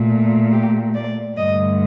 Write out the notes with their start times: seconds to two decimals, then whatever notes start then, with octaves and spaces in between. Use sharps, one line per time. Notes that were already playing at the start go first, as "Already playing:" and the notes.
Already playing: A#2 A3
0.52 G4
0.94 D5
1.37 G2 D3 A3 D#5